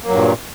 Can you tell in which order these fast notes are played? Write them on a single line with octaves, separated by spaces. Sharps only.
A#3 F#3 G2 A#2